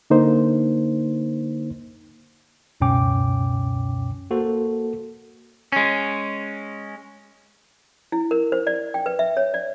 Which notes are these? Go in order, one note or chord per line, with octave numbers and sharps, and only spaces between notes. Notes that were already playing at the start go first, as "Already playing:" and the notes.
D3 A#3 D#4 C5
C#2 F#2 B2 C#4 G5 D6
A#3 F#4 A4 C5
G#3 C#4
E4
A#4
C5
D5
G5
B4
E5
C#5
D5